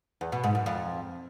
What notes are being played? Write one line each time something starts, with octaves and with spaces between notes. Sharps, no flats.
E2
B2
G#2
F#2
F2